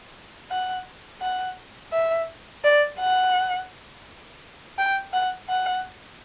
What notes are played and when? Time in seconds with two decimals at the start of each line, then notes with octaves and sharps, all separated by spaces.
0.51 F#5
1.21 F#5
1.93 E5
2.64 D5
3.00 F#5
4.78 G5
5.13 F#5
5.49 F#5